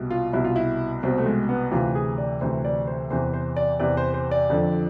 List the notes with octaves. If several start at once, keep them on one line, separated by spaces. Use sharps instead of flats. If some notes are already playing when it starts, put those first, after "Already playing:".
Already playing: C2 B2
F4
C2 B2 E4
F4
E4
C2 B2 C4
A3
G#3
B3
D2 C3 E3 F4
G#4
D5
D2 C3 E3 C5
D5
C5
E2 C3 E3 C5
C5
D5
E2 C3 E3 D5
C5
C5
D5
F2 D3 F3